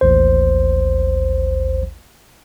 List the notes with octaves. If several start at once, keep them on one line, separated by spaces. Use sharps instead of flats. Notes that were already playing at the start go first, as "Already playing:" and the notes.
A1 D#2 C5